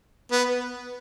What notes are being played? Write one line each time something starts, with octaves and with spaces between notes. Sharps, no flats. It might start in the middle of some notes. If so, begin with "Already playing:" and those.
B3